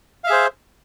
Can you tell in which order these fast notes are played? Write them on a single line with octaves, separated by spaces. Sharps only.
F5 E5 G#4 C5